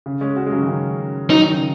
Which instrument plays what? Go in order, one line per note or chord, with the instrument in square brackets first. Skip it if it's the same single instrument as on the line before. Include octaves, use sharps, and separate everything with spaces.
[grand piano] C#3
G#3 C#4
C#4 F#4
G#3
C#3 F#3
D#3
C#3 F#3
[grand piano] F#3 [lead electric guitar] D#4
[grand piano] D#3
C#3